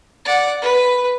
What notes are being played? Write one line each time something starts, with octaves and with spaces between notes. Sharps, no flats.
D5 F#5
B4